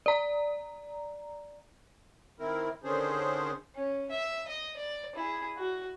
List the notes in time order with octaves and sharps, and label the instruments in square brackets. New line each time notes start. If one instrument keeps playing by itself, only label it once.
[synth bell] D5 A#5
[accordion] D#3 C4 E4 A#4
D3 D#3 C#4 D4 G#4 C5
[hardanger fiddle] C#4
E5
D#5
D5
E4 G#4
F#4